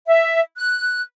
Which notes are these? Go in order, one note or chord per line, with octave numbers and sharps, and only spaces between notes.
E5
F#6